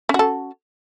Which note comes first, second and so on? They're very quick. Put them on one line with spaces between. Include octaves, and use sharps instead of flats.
C#4 F#4 A4